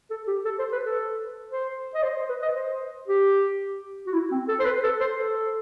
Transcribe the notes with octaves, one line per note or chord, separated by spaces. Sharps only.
A4
G4
A4
C5
B4
A4
C5
D#5
C5
C5
B4
D#5
C5
G4
F#4
E4
C4
A4
C5
B4
A4
C5
A4